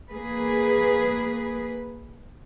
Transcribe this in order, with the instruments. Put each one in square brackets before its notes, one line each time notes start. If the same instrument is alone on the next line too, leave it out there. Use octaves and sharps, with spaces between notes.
[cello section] A#3 G#4 B4